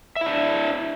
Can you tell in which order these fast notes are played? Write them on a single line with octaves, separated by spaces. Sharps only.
E5 E4 D4